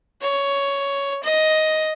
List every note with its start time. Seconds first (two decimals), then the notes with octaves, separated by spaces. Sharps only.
0.22 C#5
1.24 D#5